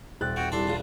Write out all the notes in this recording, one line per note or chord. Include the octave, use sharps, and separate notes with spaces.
D#1 C4 F#6 A6
C4 F#4 F#5 G5
C2 D4 A4 A5 C6
A#1 A#2 C#3